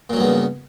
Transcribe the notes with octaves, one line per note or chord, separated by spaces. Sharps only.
G2 A#2 C#3 F#3 B3